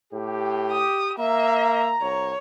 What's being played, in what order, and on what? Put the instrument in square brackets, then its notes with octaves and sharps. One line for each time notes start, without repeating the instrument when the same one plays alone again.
[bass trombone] A2 [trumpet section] G4
[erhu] D#6
[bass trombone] A#3 [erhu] E5 [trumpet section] A#5
[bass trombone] C2 [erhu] C#5